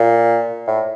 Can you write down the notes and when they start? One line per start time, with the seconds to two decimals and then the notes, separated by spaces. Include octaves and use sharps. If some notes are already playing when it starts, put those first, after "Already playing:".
Already playing: A#2
0.67 A2